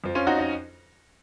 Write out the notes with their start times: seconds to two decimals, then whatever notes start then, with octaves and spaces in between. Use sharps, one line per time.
0.04 F2 F3
0.15 C#4 F4
0.27 D#4 F#4
0.39 D#4